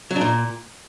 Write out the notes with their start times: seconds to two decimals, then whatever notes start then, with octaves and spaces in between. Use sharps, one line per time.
0.11 F#3
0.16 D4
0.21 A#2